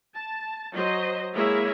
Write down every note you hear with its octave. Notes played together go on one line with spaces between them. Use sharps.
A5
F#3 C5 D#5
G#3 A#3 E4 G#4 C#5 E5